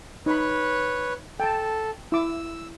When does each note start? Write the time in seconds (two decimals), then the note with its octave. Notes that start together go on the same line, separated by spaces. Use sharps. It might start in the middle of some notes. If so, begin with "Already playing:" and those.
0.26 D#4 B4 C#5 B5
1.40 A4 G5 A5
2.12 E4 D6 E6